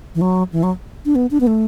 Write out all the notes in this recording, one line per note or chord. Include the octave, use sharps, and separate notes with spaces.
E3
F#3
E3
F#3
D4
B3
D4
B3
A3